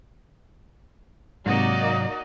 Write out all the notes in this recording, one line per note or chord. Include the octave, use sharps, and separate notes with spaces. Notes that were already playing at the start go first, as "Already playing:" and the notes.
G#2 C3 F#3 A#3 D#4 F#4 D5 D#5